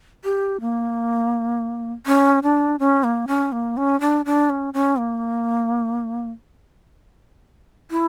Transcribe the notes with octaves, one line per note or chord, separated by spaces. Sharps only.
G4
A#3
C#4
D4
C#4
A#3
C#4
A#3
C#4
D4
D4
C#4
C#4
A#3
E4